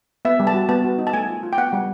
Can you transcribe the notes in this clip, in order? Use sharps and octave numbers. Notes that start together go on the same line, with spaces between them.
B3 E5
G3
A5
F#4
B3 A5
F#4
D#4
A5
A3 G#5
F4
F4
G5
B3 F#5
G3